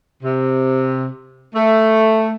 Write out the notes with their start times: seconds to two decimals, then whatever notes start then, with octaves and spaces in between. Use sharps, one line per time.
0.23 C3
1.55 A3